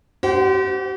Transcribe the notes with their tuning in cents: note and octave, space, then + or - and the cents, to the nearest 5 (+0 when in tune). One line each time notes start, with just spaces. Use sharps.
G4 -45 C5 -25 F#5 +0